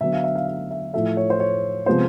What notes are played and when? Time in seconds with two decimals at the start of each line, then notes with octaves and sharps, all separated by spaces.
0.01 D3 F#3 B3 E5
0.13 F5
0.24 E5
0.35 F5
0.47 F5
0.71 E5
0.93 A2 F3 A3 E5
1.17 C#5
1.30 C5
1.40 C#5
1.86 C3 F3 G#3 B3 C5